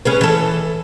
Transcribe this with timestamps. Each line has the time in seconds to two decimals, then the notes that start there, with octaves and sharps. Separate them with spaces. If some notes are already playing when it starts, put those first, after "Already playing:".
0.05 C#4 G#4 B4
0.21 E3 A4